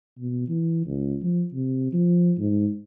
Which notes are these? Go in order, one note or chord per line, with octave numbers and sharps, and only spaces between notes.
B2
E3
C#2
F3
C3
F3
G#2